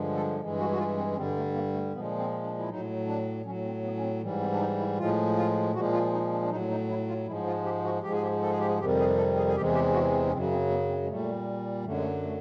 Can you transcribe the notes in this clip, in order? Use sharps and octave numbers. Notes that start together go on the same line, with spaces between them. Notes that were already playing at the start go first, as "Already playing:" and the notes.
Already playing: G2 D3 F3 G#3
A4
G2 E3 G#3
F#4
F#4
F4
C4
C#4
G2 D3 G3 C4
A3
A#3
A3
A#2 F3 G#3 B3
C4
D4
E4
A2 F#3 D#4
D4
A2 F#3 C#4
C4
B3
C#4
C4
G#2 E3 G3
C4
D4
D#4
E4
A2 F3 G#3 F4
F4
A#2 F3 G#3 F#4
F4
D#4
D4
D4
A2 F#3 D#4
D#4
E4
F4
G#2 F3 G#3 E4
F4
G4
F#4
G#2 F3 G#3 G4
G#4
G4
A4
G#4
G4
G#4
F2 C3 D#3 G3 G4
G#4
A4
G#4
G#4
E2 C3 E3 G#3 G4
G4
F#4
C4
C#4
F#2 C#3 F#3 C4
C4
B3
C4
G#3
A#2 G3 A3
F#2 D3 F#3 A3
G#3
A3
A3